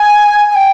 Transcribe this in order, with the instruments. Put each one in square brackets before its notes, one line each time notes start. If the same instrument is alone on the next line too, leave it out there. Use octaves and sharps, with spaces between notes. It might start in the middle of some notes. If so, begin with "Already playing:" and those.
Already playing: [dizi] G#5
G#5
G5